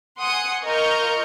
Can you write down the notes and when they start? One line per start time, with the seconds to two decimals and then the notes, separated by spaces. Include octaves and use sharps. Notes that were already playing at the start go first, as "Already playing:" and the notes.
0.19 F#5 G#5 C6 D#6 C#7
0.66 F4 A#4 D#5 C#6 F6 G6